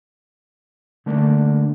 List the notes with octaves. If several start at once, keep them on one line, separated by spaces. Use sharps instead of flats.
D3 A3 A#3 D4